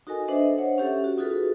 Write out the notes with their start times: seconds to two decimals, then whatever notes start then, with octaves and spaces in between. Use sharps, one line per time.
0.07 D#4 F#4 A4 A#4 D#5 G#5
0.28 D4 A4 B4 C5 D#5 E5
0.58 C5 C#5 F#5
0.78 C#4 G4 A4 E5
1.04 F#4
1.18 D#4 F4 F#4 G#4 A4 B4